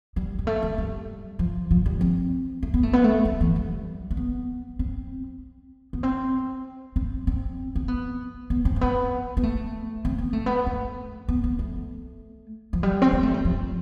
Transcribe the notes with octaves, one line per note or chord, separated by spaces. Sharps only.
G3
G3
A3
A3
G3
F3
F3
G3
C4
A3
B3
A3
B3
A3
G3
E3
G3
A3
B3
C4
B3
C4
C4
C4
C4
B3
B3
C4
A3
B3
B3
A3
C4
B3
A3
B3
A3
B3
B3
A3
F3
G3
C4
B3
A3
G3
F3